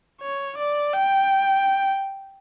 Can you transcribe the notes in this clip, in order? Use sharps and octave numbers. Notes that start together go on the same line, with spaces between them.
C#5
D5
G5